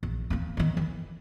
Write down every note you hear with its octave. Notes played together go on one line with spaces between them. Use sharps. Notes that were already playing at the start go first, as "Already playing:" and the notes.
A#1
A#3 C4
D#3 B3
E3